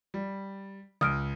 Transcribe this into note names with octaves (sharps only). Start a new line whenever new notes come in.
G3
C#2 D#6 F6 D7